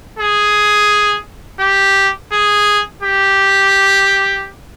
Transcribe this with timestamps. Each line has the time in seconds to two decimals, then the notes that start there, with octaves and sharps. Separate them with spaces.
0.19 G#4
1.60 G4
2.32 G#4
3.02 G4